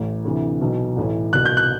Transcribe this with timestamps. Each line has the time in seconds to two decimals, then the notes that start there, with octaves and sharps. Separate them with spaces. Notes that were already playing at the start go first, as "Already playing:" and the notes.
Already playing: A1 A2 E3
0.24 D2 C3 E3
0.61 B1 B2
0.96 A1 A2 E3
1.33 C2 B2 F#6
1.45 G6
1.57 F#6